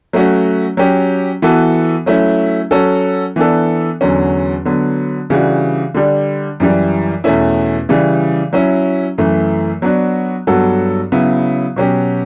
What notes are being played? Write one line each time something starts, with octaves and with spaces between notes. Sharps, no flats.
F#3 A3 C#4 F#4
F#3 C#4 G4
E3 B3 F#4 A4
F#3 A3 C#4 E4
F#3 C#4 F#4 A4
E3 B3 D4 A4
E2 D3 F#3 C#4
D3 F#3 B3
C#3 E3 G3 D4 F#4
D3 G3 D4
F#2 E3 G3
E2 B2 A3 C#4 E4
C#3 E3 G3
F#3 C#4 E4
F#2 E3 A3
F#3 B3 D4 F#4
G2 F#3 B3 F#4 A4
C#3 F#3 B3 E4
B2 F#3 C#4 G4